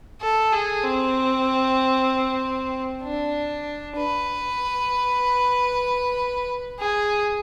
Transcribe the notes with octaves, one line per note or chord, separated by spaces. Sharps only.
A4
G#4
C4
D4
B4
G#4